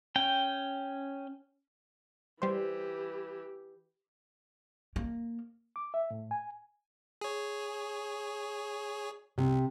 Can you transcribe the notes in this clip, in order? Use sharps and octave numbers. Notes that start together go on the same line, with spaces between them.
C#4 G5
E3 G3 G4 C5
A#3
D6
E5
A2
G#5
G#4 C#5
C2 C3